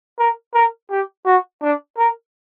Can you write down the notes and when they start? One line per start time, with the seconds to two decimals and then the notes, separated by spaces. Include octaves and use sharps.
0.19 A#4
0.54 A#4
0.90 G4
1.26 F#4
1.62 D4
1.97 A#4